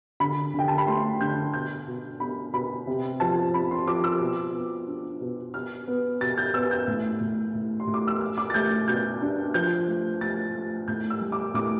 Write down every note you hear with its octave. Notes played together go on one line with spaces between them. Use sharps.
D3 B5
D3 G5
A5
B5
A3 C6
D3 G6
B2 G6
B2
B3 B5
B2 B5
C3
F3 A5
C4 B5
C6
F3 D6
E6
B2
B3
D4
B2
B2 F6
B3
B2 A6
G6
B3 E6
G6
A2
A2
A2
C6
A2
D6
E6
A3 F6
D6
A6
A3 G6
B2 G6
D4
F3 G6
A3
A3 A6
A3
A2 G6
E6
G3
D6
A2 D6